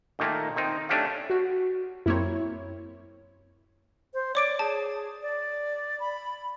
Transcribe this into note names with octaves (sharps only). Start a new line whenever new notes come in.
A#2 D#3 A3 A#3
D#3 C4 D#4
A3 C#4 D4 G4 D5 F5
F#4
F#2 A#3 C4 E4 C#5
C5
C#5 D5 D6 D7
G#4 A5
D5
B5